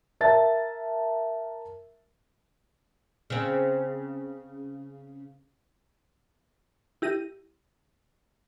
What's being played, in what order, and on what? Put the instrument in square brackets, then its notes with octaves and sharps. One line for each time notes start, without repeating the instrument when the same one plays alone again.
[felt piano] A#4 E5 A5 A6
[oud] C#3 C4
[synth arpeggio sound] E4 G4 A#6 D#7